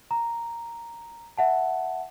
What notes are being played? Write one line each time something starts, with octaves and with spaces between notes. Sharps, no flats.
A#5
E5 F#5 A5